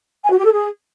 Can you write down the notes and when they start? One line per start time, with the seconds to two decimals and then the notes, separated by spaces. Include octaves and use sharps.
0.24 G#5
0.31 F#4
0.38 G4
0.45 A4
0.52 G#4